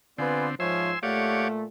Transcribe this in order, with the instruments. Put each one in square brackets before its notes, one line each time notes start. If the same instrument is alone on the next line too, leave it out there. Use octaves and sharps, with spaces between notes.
[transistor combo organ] D3 C4 [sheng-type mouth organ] B3 F4 D5 [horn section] B4 G#5 C6
[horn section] G#2 F3 [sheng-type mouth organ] C5 C#5 E5 [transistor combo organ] G#5 C6 E6
[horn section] A#2 A3 [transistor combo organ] G4 C#5 D5 [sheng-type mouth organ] F5 F#5